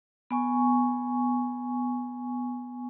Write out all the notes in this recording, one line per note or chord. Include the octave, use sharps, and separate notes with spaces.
B3 G#5 C#6